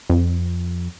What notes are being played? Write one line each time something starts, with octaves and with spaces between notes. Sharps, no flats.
F2